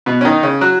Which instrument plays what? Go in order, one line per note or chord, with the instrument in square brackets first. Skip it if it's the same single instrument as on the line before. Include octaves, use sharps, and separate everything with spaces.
[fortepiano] B2 B3
C#4
D#3 D#4
C#3 C#4
F#3 F#4